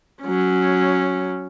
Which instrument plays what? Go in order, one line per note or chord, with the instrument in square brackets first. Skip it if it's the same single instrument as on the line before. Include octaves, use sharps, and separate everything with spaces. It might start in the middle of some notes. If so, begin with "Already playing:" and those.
[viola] F#3 C#4